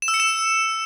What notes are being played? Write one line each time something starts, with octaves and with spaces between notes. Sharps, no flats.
E7
E6
C#7
E7